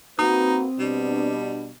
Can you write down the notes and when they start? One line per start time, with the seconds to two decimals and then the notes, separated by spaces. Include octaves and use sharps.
0.19 A#3 C4 D#4 F#4 B4 D#6
0.79 B2 G3 D4